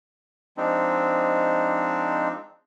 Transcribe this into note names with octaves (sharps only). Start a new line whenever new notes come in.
F3 G#3 C4 D4 D#4